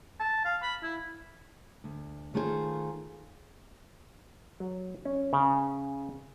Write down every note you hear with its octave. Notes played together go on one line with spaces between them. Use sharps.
A5
F5
B5
E4
D2
D#3 A3 F4 G#4 A#4 C5
F#3
C#4
C#3